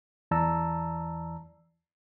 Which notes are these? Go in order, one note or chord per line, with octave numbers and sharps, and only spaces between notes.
E2 E3 D5 A5 A#5 E6